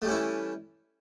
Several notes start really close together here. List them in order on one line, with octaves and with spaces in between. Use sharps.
A3 G3 C#4 E4 E3